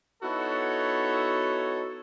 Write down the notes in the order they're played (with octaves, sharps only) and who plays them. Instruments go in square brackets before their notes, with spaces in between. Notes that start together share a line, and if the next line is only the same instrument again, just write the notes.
[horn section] B3 D#4 E4 F#4 A4 C#5